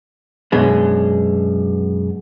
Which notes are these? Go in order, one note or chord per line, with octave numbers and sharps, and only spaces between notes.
F#2 B2 G#3 D4